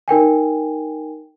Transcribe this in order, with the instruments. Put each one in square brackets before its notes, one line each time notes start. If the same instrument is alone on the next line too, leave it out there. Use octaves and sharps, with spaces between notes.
[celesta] D#4 A#4 G5 G#5